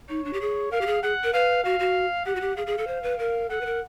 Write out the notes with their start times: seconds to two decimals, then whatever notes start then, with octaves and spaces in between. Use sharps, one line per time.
0.09 D#4 C#5
0.25 D4
0.33 G4
0.41 G#4
0.71 A#4 F5
0.81 G4
0.87 G#4
1.03 G#4 F#5
1.24 A#4
1.33 B4 F5
1.64 F#4 F5
1.80 F#4
2.26 G4 F#5
2.35 F#4
2.41 G4
2.57 G#4 F5
2.67 G#4
2.78 A4
2.87 C5
3.03 B4
3.19 A#4
3.50 A4 F#5
3.61 B4
3.66 A#4